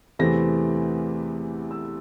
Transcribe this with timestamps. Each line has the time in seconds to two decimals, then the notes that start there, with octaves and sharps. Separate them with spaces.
0.19 E2 C3 E3 A3 C4 A#6
1.71 E6